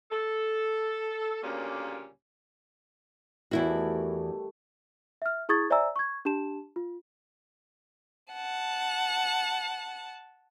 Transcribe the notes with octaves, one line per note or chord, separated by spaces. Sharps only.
A4
D2 A#2 C#3 G3 A#3 C#4
E2 D#3 G3 A3 E4 F#4
E5 F6
E4 G#4 C#6 D#6 G#6 A6
C5 D5 E5 G#5 A#5 E6
C#6 G#6
D4 G4 A5 E7
F4
F#5 A5